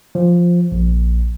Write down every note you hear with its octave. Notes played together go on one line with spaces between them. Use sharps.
F3
A#1